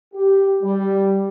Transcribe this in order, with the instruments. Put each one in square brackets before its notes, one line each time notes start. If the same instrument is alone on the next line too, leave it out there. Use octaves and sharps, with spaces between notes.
[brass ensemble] G4
G3